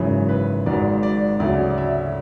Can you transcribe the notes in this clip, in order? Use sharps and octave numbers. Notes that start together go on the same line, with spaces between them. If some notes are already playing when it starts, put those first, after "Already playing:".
Already playing: G#1 F#2 C#3 E3 C#5
B4
G#1 G#2 F#3 D5
D5
D2 C#3 F#3 D5
D5
E5